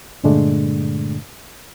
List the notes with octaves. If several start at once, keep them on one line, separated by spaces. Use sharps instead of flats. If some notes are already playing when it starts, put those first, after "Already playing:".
G2 A#2 D3 G#3 A3 D4